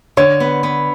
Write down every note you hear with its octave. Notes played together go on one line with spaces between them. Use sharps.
D3 C#5
B3
B3